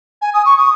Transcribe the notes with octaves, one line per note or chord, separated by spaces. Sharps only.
G#5
D#6
C#6
D#6